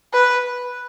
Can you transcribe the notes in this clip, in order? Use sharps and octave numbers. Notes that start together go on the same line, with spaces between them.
B4